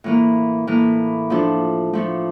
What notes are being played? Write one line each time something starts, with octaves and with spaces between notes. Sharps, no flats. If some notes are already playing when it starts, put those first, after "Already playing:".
A2 E3 A#3
A2 E3 A#3
F3 A3 D4 A4
F3 A3 D4 A4